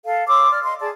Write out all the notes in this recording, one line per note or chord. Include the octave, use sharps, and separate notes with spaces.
A4 F5
C#5 C6 D6 E6
D5 F6
D#5 C6
G#4 D5 A5